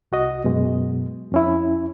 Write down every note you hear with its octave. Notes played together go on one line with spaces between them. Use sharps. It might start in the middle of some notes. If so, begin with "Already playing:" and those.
C2 F#4 D#5
F#2 B2 G#3
F2 C#4 E4